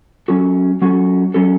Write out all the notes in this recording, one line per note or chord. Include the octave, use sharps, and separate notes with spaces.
F#3 C#4 F#4 A4
F#3 C#4 F#4 A4
F#3 C#4 F#4 A4